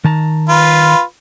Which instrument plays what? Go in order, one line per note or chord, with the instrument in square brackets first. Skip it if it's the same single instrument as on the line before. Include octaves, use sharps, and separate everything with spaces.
[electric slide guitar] D#3 A5 A#5
[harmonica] F4 B4